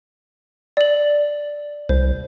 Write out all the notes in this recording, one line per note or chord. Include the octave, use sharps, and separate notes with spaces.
D5 F#7
C2 C5